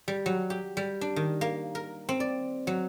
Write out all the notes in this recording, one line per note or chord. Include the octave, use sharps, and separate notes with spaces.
G3
F#3
G4
G3
D4
D#3
A#3
A#4
C4
D5
F#3